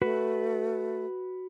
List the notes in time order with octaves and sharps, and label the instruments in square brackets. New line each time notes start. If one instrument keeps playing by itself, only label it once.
[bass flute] A3 [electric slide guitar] F#4 B4